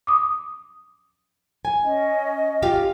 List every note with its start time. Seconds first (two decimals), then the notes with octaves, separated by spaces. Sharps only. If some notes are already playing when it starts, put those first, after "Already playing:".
0.07 D6 D#6
1.65 G#5
1.83 C#4 D#5
2.62 F4 G4 F5